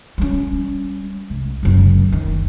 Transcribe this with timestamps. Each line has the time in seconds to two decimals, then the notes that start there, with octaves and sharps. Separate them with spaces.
0.18 G3 C#4
1.30 C2
1.63 F#1 F#2
2.12 D#3